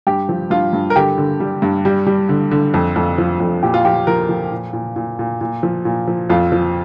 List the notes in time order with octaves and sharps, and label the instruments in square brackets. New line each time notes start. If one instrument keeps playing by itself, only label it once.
[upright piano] G2 G4
F3
G2 F4
G2
A#4
D3 G4
D3
G3
G2
G3
G3
D3
D3
F2
F2
F3
F2
A#2 G4
F4
F3 G4
F3 A#4
F3
A#2
A#2
A#2
A#2
A#2
F3
A#2
F3
F2 F4
F3